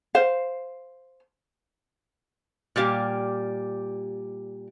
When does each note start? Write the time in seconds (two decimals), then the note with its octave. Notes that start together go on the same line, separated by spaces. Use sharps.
0.15 C5 F5
2.76 A#2 G3 G4 F5